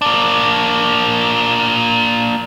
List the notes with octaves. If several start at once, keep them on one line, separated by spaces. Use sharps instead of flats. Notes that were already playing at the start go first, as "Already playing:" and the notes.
A#3 D4